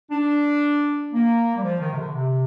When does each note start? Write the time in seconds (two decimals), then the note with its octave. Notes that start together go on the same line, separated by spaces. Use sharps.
0.11 D4
1.12 A#3
1.56 G3
1.63 F3
1.80 D#3
1.92 C3
1.97 D3
2.14 C3